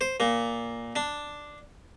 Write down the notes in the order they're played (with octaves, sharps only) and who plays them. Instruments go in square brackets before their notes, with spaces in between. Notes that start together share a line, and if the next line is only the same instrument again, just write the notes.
[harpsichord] C5
A#2
D4